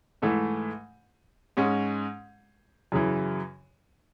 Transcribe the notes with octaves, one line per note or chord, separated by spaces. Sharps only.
G#2 E3 A3
G#2 G#3 C#4
F#2 C#3 E3